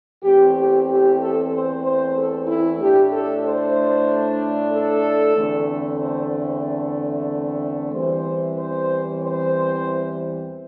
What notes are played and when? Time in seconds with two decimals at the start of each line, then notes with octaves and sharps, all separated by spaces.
0.23 E2 E3 A3 C4 G4
0.56 G4
0.88 G4
1.20 A4
1.52 C5
1.84 C5
2.16 A4
2.47 E4
2.80 A2 A3 D4 G4
3.12 A4
3.44 C5
4.72 A4
5.36 E2 D3 A3 C4
6.00 C5
7.92 E2 E3 G3 C4 C5
8.57 C5
9.21 C5